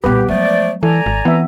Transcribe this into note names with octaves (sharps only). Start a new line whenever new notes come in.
C2 A#2 B3 G4 B4
F3 F#3 G#3 A3 D5
E3 A4 D5 G#5 A#5
G#1
E3 B3 C4 E5